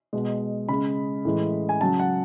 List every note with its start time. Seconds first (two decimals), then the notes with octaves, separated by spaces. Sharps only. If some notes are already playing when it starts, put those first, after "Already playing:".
0.13 B2 G#3
0.69 C#3 G#3 B5
1.25 A2 E3 G#3
1.69 G#5
1.81 C#3 F#3 A5
1.99 F#5